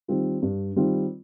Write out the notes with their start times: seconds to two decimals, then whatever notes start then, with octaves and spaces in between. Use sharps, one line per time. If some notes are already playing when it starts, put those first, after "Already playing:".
0.08 D#3 G3 C4 F4
0.42 G2
0.76 D#3 G3 C4 F4